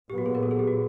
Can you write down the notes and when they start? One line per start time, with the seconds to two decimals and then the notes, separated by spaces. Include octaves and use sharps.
0.10 A#2 F#3 B3 G4
0.18 F#4
0.26 G#4
0.35 A#4
0.43 A4
0.51 G#4
0.59 G4
0.68 F#4